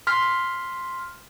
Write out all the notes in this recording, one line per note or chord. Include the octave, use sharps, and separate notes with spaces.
C6 F6 B6